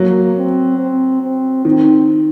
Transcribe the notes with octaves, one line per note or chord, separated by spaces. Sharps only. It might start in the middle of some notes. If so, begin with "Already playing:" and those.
Already playing: F#3 A#3
C4
C4
C4
D#3 C4